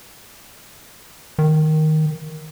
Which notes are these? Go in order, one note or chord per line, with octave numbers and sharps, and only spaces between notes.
D#3